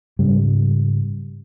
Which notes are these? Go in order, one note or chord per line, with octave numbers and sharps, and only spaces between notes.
G#2 C#3 G3